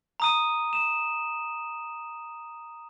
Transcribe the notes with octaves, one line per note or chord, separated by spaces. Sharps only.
A#5 D#6 D#7
E7